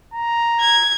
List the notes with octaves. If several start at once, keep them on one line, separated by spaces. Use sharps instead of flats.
A#5
G#6